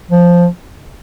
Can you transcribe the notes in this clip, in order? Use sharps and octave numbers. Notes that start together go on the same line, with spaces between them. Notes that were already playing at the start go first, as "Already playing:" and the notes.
F3